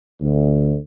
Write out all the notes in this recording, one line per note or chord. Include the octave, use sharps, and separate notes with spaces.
D2